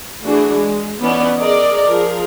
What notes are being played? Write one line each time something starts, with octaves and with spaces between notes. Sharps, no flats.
E3 A3 D4 F#4 G#4
G#3
E3 B3 C#4 D#4 D5
G#4 A#4 D5 D#5
F3 G#4 A#4